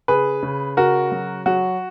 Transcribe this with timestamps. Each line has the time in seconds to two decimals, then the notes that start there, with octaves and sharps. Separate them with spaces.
0.08 C#3 G#4 B4
0.43 C#3
0.77 C#3 F#4 A#4
1.12 F#3
1.46 F#3 F#4